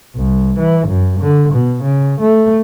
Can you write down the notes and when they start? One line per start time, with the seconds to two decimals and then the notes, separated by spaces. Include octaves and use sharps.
0.16 C2
0.58 E3
0.88 F#2
1.20 D3
1.53 B2
1.83 C#3
2.21 A3